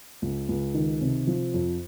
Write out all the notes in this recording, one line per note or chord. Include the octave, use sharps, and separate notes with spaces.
C#2
C#2
D#3
C3
F3
F2